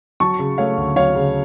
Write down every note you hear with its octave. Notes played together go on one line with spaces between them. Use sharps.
F#3 A5 C#6
C#3
A3 C#5 F5
D2
F#3 C#5 F5
C#3